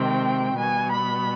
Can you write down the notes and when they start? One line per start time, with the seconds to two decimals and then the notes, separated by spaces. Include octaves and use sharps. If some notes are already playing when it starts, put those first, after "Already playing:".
Already playing: C3 D#3 G#3 C4 G5
0.58 B2 G3 B3 G#5
0.92 B5